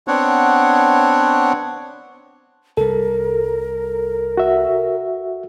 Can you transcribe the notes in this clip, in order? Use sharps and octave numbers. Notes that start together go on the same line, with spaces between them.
B3 C4 D4 C#5 F#5
C2 G3 A4 A#4
F#4 E5